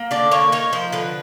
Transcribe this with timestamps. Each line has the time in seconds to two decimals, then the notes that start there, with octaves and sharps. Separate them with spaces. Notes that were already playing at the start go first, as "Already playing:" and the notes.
Already playing: A#3
0.11 D3 D5
0.32 A#3 C#5
0.52 D#4 C#5
0.73 F3 C5
0.92 D3 B4